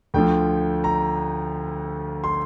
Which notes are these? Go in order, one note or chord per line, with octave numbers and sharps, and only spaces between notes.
D2 D3 F3 G5
A#5
C6